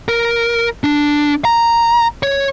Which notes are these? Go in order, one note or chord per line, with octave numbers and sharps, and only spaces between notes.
A#4
D4
A#5
C#5